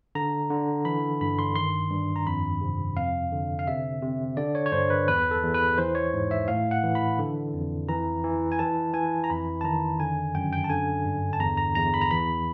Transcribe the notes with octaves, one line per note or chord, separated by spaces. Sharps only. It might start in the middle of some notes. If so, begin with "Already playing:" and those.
D3 A#5
D3
E3 B5
G2 B5
C6
D#3 C6
G2
A#5
F2 B5
C3
F2 F5
D3
F5
C3 E5
C3
D3 D5
C#5
C#5
G2 C5
B4
E2 B4
A4
E2
B4
E3 C5
C#5
G#2
E5
A2 F5
F#5
E3
B5
D3
F2
E3 A#5
E3
G#5
E3 A5
E3 G#5
A#5
F2 B5
A5
D#3 A#5
D3 G#5
F#2 G5
G5
A5
D3 G#5
G2
A5
E2 A#5
A#5
E2 A#5
B5
A#5
E3 B5